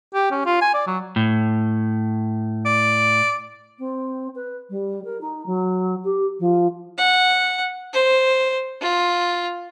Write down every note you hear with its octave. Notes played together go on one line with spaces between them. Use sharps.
G4
C#4
F4
G#5
D5
F#3
A2
D5
C4
B4
G3
A#4
D#4
F#3
G4
F3
F#5
C5
F4